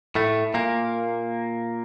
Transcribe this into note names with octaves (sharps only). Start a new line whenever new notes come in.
A2 A3
A#2 A#3